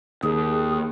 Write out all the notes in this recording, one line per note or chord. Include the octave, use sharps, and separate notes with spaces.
D#2 G#4